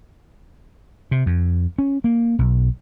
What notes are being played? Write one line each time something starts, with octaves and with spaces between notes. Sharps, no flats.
C3
F2
C#4
A#3
B1